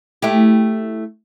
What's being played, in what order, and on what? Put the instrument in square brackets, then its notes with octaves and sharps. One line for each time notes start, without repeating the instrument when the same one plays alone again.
[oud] A3 E4 G4